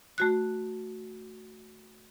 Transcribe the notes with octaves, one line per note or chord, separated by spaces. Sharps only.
A3 F#4 F#6